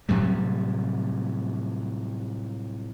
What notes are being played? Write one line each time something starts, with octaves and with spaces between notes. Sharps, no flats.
A2 C3 F#3 G3